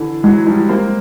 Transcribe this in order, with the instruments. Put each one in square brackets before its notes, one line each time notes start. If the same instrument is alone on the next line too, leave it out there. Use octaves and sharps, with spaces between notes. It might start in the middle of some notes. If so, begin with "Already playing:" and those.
Already playing: [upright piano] D3 E3
[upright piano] E3 F#3 [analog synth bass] G#3
[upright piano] F3 G3
A#3 C4